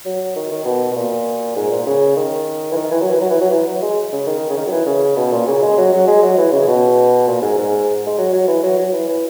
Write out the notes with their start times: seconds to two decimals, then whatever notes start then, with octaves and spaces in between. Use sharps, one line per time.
0.06 F#3
0.36 D#3
0.51 D#3
0.65 B2
0.92 B2
0.96 A#2
1.56 G#2
1.71 A#2
1.87 C#3
2.16 D#3
2.72 E3
2.76 D#3
2.91 E3
3.01 F#3
3.11 E3
3.21 F#3
3.31 E3
3.41 F#3
3.50 E3
3.67 F#3
3.82 G#3
4.12 C#3
4.27 D#3
4.50 C#3
4.57 D#3
4.67 F#3
4.72 E3
4.86 C#3
5.16 B2
5.32 A#2
5.47 C#3
5.62 G#3
5.77 F#3
5.92 F#3
6.08 G#3
6.22 F#3
6.37 E3
6.53 C#3
6.67 B2
7.27 A#2
7.42 G#2
7.58 G#2
8.06 G#3
8.18 F#3
8.33 F#3
8.48 E3
8.63 F#3
8.78 F#3
8.92 E3
9.08 E3